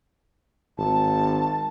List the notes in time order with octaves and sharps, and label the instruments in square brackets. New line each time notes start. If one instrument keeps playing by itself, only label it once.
[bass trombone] G#1 [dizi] A5